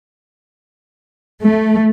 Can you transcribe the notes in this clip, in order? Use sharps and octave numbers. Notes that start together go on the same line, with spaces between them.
A3